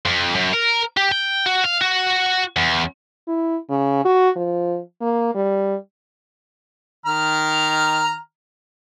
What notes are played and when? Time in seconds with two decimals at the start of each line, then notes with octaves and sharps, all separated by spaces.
0.06 F2
0.35 F#2
0.54 A#4
0.97 G4
1.12 G5
1.46 F#4
1.64 F5
1.81 F#4
2.57 E2
3.28 E4
3.70 C#3
4.05 F#4
4.36 F3
5.01 A#3
5.34 G3
7.06 D#3 A#5 F6